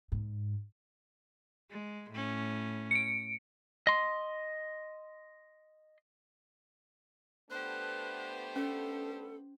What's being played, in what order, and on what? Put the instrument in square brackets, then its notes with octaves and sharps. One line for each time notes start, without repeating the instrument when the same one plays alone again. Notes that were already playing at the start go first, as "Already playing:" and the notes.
[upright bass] G#2
[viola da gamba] G#3
A2 C#4
[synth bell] C#7 D7
[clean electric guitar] D#5 C6
[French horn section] A3 B3 D4 [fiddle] G4 C5 [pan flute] F#6
[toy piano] C#4 [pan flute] A4